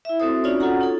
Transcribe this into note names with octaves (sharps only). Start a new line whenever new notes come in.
E4 E5
C4 F#4 A4 C5 D#6
C#4 D#4 F4 F#4 C#5 D5
C#4 F4 F#4 A4 F#5 A#5
D#4 A4